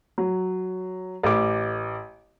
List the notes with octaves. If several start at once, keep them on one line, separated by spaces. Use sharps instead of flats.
F#3
A1 D6